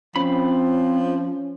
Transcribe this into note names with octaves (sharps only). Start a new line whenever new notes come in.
F3 C4 C#4 B5